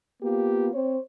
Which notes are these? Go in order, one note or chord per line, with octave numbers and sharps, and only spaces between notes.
A#3 B3 F4 G4
C4 C5 C#5